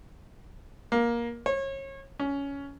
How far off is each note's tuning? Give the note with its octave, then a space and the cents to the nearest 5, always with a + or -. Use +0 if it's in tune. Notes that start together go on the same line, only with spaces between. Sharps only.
A#3 +15
C#5 -30
C#4 +15